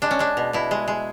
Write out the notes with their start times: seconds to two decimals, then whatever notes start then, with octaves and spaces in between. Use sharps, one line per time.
0.02 G#3 D4
0.11 C#4
0.19 G#3 D4
0.37 B2
0.53 B2 E4
0.71 G#3
0.88 G#3